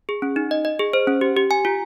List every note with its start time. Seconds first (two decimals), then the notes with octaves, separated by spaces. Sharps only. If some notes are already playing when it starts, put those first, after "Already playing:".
0.09 G#4
0.22 C#4
0.36 D#4
0.51 D#5
0.65 D#5
0.79 G#4
0.93 C5
1.07 C#4
1.21 G4
1.37 G4
1.51 G#5
1.65 F4